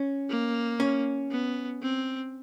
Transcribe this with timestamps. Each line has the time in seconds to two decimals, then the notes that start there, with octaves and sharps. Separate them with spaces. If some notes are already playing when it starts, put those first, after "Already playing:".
Already playing: C#4
0.30 A#3
0.80 C#4
1.31 B3
1.83 C4